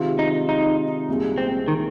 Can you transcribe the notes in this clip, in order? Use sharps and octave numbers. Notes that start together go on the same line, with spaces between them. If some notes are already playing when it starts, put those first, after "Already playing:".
Already playing: C3 D#3 G#3 C4 F4
D#4
D#4
C2 A#2 G#3
C4
D#3